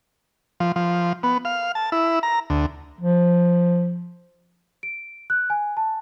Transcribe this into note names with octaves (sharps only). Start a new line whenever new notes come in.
F3
F3
B3
F5
A5
E4
A#5
D2
F3
D7
F#6
G#5
A5